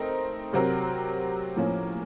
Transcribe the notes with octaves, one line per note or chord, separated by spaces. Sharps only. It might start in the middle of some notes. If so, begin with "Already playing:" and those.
Already playing: A3 C4 D#4 A#4
C3 F#3 C4 F#4 A#4
A2 F3 A#3 C#4